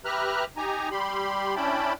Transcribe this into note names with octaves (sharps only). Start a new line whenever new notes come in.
G4 B4 E5 A#5 F6 F#6
D#4 G4 G#5 A#5
G3 G4 B5 C6
C#4 D4 E4 G5 A5 B5